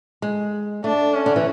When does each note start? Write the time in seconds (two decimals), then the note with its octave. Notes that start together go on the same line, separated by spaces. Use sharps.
0.22 G#3
0.84 A3 D4
1.15 C#4
1.26 D3
1.36 E3